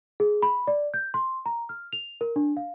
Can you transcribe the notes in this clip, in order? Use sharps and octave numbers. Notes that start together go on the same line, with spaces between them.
G#4
B5
D5
G6
C6
A#5
F6
F7
A#4
D4
F5